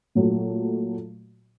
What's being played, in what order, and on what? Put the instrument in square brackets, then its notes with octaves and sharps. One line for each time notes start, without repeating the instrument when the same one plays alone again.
[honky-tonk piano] A#2 F#3 A3